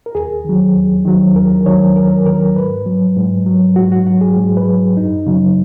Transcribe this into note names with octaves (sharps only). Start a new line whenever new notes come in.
A#4
D#2 G#4
D#3 F#3
D#2
D#3 F#3
D#2 A#4
D#3 F#3 C#5
D#2 A#4
D#3 F#3 A#4
G#2 B4
F#3
G#2
F#3
G#2 F#4
F#4
F#3 F#4
G#4
G#2
B4
F#3
F#2 D#4
C#3 F#3